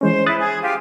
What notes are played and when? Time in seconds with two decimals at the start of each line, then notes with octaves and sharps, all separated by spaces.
0.01 E3 G#3 C#4 C5
0.26 E4 D#6 F#6 A6
0.38 G#4
0.62 F4 G4